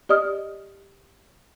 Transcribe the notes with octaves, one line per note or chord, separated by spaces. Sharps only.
G4 D5 D#5 D#6 F6